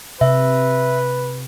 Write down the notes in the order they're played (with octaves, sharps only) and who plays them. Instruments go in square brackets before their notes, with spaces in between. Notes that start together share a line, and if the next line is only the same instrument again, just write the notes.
[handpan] C3 [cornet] B4 [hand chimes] E5